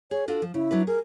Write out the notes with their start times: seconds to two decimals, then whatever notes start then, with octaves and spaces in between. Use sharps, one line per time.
0.11 G#4 C#5
0.28 D4 F4 F#4 A4
0.42 F3
0.54 C#3 E4
0.71 F#3 D4 B4
0.87 G#4 A#4